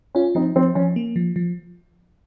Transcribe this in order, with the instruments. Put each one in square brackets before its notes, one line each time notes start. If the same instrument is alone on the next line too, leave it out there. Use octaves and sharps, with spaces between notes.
[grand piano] C#4 [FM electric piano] F4
[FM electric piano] F3 [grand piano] C4 D#4
[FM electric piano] F3 [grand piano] C4
[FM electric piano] F3 [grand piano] C#4
[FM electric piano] A#3
F3
F3